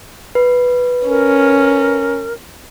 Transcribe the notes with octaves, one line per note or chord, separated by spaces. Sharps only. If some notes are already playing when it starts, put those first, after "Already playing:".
B4
C#4 A#4